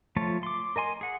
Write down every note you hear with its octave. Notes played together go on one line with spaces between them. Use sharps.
F3 A3 F4 C#5 A5
C6 D6
A#4 D#5 G#5 C6
G#4 F#5